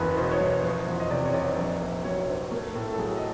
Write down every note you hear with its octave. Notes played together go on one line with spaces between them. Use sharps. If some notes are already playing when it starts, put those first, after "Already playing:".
Already playing: F#1 E2 B4
B2 C5
C#5
F#1 C5
F3
E2
D#5
C3 D5
C#5
F1 D5
A#1
A#2
F#3 C#5
A#1 C5
A3 A#4
A2 A4
A4
F#3 G#4
D#5